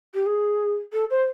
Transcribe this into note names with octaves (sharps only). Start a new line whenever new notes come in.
G4
G#4
A4
C5